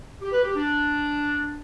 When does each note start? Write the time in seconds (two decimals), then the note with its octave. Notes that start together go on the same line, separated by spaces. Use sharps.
0.21 G4
0.32 B4
0.43 G4
0.55 D4